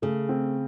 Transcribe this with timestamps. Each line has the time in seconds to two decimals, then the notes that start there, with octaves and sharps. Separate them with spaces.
0.02 C#3 A3
0.29 C4